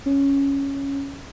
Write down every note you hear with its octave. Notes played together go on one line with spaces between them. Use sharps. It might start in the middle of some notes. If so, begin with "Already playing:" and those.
C#4